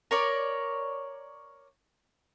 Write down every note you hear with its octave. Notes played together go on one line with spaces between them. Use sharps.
A#4 C#5 D5